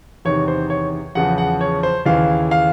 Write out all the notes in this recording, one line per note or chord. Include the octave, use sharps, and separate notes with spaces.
E2 C3 D#3 C#5
C5
C#5
E2 C#3 F3 F#5
F#5
C#5
C5
D#2 C#3 E3 F5
F5